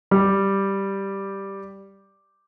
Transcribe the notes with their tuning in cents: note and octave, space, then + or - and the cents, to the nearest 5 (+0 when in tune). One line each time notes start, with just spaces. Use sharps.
G3 +0 G4 +0